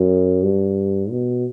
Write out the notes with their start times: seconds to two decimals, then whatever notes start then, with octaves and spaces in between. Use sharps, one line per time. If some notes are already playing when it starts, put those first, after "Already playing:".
Already playing: F#2
0.43 G2
1.11 B2